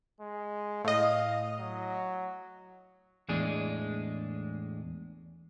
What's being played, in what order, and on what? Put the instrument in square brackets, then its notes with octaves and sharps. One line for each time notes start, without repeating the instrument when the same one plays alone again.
[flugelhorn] G#3
[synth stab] A2 D#5 [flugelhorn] F5
[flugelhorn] F#3
[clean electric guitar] E2 A2 G#3 D4 G#4